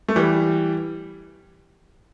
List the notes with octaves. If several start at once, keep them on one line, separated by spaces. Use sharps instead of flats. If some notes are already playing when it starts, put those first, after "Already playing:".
A3
E3 G3